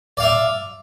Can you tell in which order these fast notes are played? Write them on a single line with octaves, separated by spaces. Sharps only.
D5 F5 E5